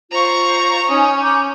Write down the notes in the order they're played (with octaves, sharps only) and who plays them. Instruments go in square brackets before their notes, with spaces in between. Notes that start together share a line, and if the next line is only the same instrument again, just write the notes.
[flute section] F4 C5 [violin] A#5 C#6
[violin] C#4 [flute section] D#4 G#5 D#6
[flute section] A#5 D6 G6